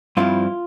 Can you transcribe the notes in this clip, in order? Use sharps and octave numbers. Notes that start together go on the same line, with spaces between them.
G2 F3 C4 E4 F4